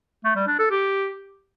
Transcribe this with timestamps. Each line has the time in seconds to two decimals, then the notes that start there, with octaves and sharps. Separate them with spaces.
0.24 A3
0.36 G3
0.47 D4
0.59 A4
0.71 G4